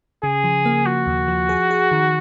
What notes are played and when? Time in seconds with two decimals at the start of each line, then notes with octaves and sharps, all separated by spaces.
0.23 C#3 G#4
0.44 F3
0.65 A#3
0.86 F3 F#4
1.07 D#2
1.28 F3
1.49 G#4
1.71 G#4
1.92 D#3